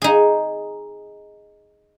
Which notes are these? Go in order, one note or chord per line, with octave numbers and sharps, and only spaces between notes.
D#4 G#4